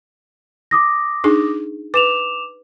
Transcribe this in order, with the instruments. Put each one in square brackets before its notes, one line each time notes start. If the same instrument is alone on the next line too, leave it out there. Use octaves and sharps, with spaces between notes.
[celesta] D6 D#6 A#6
[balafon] D4 D#4 G#4
[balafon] B4 [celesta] D6 E7 F7